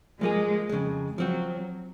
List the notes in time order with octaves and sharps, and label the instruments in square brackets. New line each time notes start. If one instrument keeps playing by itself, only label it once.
[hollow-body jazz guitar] F3 A#3 F4 G#4 [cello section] G#3
[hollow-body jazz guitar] F2 C#3 G#3
[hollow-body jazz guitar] F3 C4 F#4 [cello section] F#3